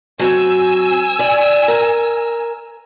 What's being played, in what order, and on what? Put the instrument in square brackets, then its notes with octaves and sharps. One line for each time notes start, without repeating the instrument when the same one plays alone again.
[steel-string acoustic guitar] F#3 C4 [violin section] G#5 E6
[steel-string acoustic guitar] D5
A#4